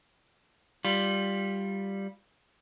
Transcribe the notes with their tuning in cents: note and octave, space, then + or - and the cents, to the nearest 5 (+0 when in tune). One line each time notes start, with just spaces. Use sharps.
G3 +0 F4 +0